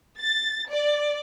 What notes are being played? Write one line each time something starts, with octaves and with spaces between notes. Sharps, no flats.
A6
D5